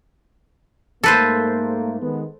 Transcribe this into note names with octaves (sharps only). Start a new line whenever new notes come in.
G#2 A3 A#3 A4 B4 C5
D#3 G#3 B3